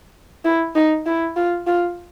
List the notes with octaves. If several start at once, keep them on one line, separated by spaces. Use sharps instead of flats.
E4
D#4
E4
F4
F4